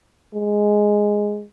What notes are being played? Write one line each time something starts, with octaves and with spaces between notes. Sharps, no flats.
G#3